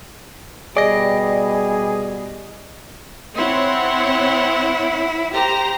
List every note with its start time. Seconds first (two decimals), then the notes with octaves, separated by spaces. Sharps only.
0.77 B2 G3 G#4 D5 D#5
3.35 C4 E4 C#5 F#5
5.33 G4 C5 A#5